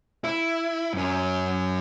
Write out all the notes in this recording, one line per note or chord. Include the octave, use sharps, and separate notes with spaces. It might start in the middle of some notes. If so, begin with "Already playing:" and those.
E4
F#2 C#4